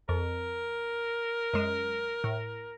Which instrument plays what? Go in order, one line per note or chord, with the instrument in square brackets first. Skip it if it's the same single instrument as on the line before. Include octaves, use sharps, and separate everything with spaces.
[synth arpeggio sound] F2 [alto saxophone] A#4
[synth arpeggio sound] F#2 G#3
A2